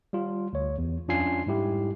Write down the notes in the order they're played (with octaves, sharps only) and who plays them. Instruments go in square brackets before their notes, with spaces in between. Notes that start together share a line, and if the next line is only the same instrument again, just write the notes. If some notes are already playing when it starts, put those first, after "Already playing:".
[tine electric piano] G3 F4
D2 C#5
E2
F2 C#4 D4 F4 G#5 C7
G#2 G3 E4 G4